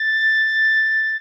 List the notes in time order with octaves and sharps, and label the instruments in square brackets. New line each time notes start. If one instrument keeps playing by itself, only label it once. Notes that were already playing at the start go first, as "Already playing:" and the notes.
Already playing: [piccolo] A6